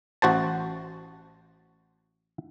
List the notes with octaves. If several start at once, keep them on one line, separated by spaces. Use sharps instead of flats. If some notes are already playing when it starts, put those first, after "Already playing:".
A1 F#4 C5 A5